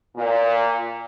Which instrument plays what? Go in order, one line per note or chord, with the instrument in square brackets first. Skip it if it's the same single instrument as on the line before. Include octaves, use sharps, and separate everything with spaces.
[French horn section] A#2